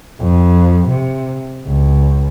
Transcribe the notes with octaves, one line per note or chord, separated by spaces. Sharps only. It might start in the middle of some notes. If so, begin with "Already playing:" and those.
F2
C3
C#2